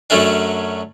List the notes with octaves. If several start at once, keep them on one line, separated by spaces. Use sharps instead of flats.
F#2 F#3 A3 C#4 D4